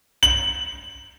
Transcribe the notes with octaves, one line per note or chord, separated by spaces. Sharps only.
F#7